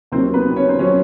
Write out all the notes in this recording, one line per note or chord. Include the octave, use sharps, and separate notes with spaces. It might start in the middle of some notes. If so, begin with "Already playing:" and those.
D#2 D#3 F#3 C4 C5
B3 B4
C#4 C#5
C5
D#3 F#3 C#4 C#5